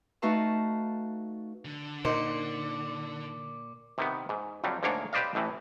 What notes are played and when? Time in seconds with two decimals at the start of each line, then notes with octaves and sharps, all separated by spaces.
0.22 A3 D#4 F#4 B4 F5 A5
1.65 D3
2.05 A#2 D#4 A#4 C5 D6
3.98 C3 D#3 B3
4.29 G#2
4.64 F2 F#3 G3
4.83 D2 G#2 A#3 D4 C#5 F#5
5.13 G4 B4 C5 D5 D#5 F5
5.35 A1 A2 E3